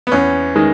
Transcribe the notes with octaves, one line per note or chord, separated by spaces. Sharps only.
B3
E2 C#4
D#3 G#3